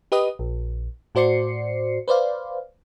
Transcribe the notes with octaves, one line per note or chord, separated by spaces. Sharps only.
G4 B4 D#5 D#6
A#1
A2 F#4 C5 D5 C7 C#7
B4 C5 D5 F5